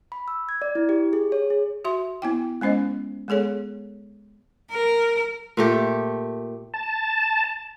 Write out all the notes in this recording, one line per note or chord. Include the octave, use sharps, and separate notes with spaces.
B5
E6
G#6
D5
E4
G4
G#4
C#5
G#4
F#4 E5 C6
B3 E4 G5
G#3 B3 C#4 C5 D#5
G#3 B3 G#4 A4 C#5
A#4
A#2 A3 G4
A5